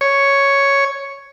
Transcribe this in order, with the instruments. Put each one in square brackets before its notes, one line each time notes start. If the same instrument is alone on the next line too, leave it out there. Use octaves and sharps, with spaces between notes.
[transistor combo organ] C#5